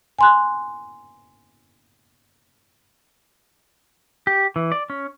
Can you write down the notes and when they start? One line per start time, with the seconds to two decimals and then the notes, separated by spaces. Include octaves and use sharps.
0.19 G#5 C6 F#6
4.27 G4
4.56 E3
4.72 D5
4.90 C#4